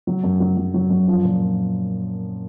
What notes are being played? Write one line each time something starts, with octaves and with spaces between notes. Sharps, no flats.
F#3
F#2
F#3
F#3
F#3
F#2
F3
A#2